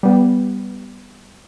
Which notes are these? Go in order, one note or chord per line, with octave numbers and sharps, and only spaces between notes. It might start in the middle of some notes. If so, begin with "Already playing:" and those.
G3 B3